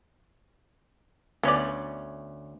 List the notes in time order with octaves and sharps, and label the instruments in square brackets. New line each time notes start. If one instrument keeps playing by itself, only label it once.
[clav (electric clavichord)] D2 C#4 [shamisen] B3 D5